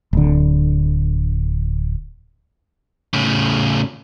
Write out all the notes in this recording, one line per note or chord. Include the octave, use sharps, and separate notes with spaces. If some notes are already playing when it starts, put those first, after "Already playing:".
D1 D3
A2 C#3